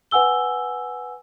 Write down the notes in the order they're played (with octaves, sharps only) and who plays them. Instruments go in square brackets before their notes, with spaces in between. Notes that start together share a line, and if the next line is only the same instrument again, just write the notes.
[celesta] B4 F#5 G#5 E6 G7